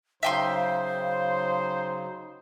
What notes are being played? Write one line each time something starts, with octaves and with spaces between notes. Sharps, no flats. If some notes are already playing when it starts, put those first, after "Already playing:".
C#3 F#3 D#4 C5 E5 F5 G5 C6